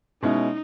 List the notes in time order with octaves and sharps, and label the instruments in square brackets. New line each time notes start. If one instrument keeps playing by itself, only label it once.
[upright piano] B2 G#3 C#4 E4 [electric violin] D#4